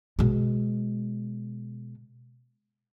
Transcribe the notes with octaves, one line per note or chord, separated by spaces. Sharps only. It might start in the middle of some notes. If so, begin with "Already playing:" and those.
B2 G#3